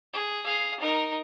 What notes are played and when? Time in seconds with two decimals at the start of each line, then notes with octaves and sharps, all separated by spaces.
0.13 G#4
0.44 G#4 F5
0.80 D#4 A#4